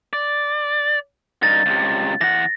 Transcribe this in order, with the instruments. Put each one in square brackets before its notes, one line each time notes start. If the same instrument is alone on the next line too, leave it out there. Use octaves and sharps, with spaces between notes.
[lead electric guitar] D5
[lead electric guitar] G2 D#4 [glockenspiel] A6
[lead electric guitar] C#2 C3
[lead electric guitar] E3 F#5 [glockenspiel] A#6